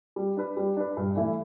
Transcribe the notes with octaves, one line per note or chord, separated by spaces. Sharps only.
G3
D4 B4
G3
D4 B4
G2
E3 A3 E4